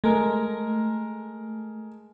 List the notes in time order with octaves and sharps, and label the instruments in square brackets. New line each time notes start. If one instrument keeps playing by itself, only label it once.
[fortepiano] G#3 A#4 [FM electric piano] A3